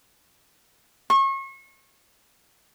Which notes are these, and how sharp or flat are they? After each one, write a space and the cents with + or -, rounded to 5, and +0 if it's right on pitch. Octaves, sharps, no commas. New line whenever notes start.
C#6 -35